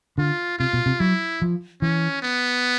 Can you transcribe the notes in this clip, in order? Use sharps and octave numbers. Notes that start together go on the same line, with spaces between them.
D3 F4
C3 F4
B2
C3
F#3 E4
F3
E3 C#4
B3